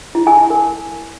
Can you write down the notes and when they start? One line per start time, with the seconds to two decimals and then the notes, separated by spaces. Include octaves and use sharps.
0.15 E4
0.27 G#5
0.39 A5
0.50 A#4